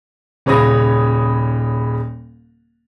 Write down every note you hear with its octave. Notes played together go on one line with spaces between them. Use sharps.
D#1 C#3 C#5 B5 D#6 A#6